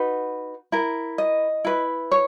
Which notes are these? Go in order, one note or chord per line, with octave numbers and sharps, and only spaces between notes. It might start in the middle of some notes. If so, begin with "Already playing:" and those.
Already playing: D#4 F#4 B4
E4 A#4
D#5
E4 B4
C#5